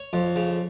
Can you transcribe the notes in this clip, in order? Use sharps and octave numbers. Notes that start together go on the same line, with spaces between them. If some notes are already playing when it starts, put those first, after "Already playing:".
Already playing: C#5
F2
C#3